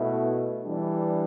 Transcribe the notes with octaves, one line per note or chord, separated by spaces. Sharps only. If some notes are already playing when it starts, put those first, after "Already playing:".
Already playing: B2 A3 E4
E3 G3 D4